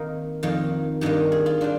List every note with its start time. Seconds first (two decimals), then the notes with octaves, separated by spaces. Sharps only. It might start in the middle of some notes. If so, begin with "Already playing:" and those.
Already playing: D#3 A#3 C4 D#4
0.43 F2 D#3 A#3
1.01 G2 D#3 A#3 D#4 G4
1.32 G#4
1.46 F4
1.61 G3 D4 F4